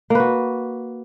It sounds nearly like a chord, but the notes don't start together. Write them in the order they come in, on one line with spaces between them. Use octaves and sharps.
A#3 B4 F#4